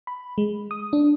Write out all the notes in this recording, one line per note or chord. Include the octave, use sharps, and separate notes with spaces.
B5
G#3
D#6
D4